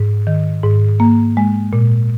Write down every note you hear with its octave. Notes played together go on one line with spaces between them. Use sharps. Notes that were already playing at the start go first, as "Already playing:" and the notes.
Already playing: G#2
D#3
G#2
A#3
G#3
A#2